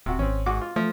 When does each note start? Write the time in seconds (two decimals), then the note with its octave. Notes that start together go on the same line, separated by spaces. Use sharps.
0.06 D1 C3 F#4
0.19 G#1 C4 C#4
0.46 G#2 F#4 D6
0.61 F4
0.76 F3 A3